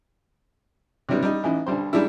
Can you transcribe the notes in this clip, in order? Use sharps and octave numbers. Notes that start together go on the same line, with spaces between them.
C3 D#3 F#3 G3 B3
G3 D#4
A1 E3 D#4
B1 D3 G3 C5
G#2 G3 G#3 D4 E4